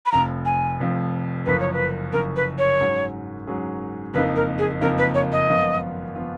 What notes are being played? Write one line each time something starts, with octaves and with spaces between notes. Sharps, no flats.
B5
F1 F2 F3 A#5
G#5
F1 F2 F3
F#1 F#2 F3 B4
C#5
B4
F#1 F#2 F3 A#4
B4
C#5
G#2 F#3 C#4 G#4
G#2 F#3 C#4 G#4
F#1 F2 F3 A#3 D#4 B4
A#4
G#4
F#1 F2 F3 A#3 D#4 A#4
B4
C#5
D#5
G#1 F#2 F3 B3 F4
F3 B3 F4